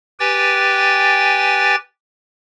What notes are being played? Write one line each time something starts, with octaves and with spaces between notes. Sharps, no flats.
G4 B4 G5 G#5 A6